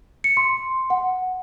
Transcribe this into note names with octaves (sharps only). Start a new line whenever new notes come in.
C#7
C6
F#5